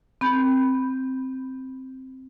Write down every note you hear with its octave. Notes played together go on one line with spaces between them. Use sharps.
C4 B5 G6